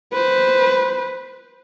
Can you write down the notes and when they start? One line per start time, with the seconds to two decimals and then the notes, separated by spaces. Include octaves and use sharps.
0.13 B4 C5